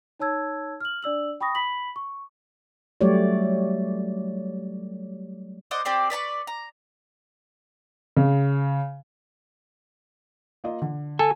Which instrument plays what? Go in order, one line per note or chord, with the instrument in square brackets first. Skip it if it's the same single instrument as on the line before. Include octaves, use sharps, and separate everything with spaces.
[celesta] D#4 C#5 A5 E6 G#6
F6 F#7
D4 D5 E6 F#7
G5 B5 C#6 D#6 A#6
B5 B6 F#7
C#6
[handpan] F#3 G3 A3 G4 C#5 D5
[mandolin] C5 D5 D#5 F#5
C4 G4 D5 C6
B4 D5 A#5 C#6
A#5
[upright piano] C#3
[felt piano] A#3 F4 D#5
D3
[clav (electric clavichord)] A4 [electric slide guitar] G#5